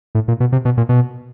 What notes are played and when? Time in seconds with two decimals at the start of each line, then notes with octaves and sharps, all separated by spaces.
0.15 A2
0.28 A#2
0.40 B2
0.52 C3
0.65 B2
0.77 A#2
0.89 B2